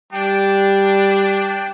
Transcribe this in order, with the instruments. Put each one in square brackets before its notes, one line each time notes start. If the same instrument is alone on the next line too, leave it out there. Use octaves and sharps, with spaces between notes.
[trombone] G3 [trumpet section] D4 [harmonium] G5